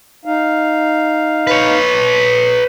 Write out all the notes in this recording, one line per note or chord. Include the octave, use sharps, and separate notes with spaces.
D#4 F5
B4 C#5